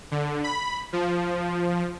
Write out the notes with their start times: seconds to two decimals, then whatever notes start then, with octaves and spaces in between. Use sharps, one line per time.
0.11 D3
0.44 B5
0.93 F3